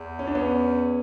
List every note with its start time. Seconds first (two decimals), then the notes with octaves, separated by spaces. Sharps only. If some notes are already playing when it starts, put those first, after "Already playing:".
Already playing: E2
0.19 C#4
0.27 D4
0.35 B3 C#4